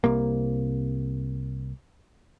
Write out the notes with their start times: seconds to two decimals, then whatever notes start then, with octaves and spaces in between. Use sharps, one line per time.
0.04 C2 C3 A#3